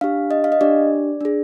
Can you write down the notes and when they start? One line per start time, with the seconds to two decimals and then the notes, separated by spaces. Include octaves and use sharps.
0.01 D4 G4 F5
0.31 D#5
0.44 F5
0.52 D#5
0.61 D4 G4 D5
1.21 D4 G#4